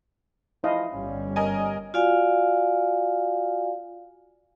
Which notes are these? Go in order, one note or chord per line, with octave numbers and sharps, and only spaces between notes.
F3 E4 D#5 F5
G1 G2 G3 C#4
A#4 D#5 G#5
F4 F#4 D5 F5 G#5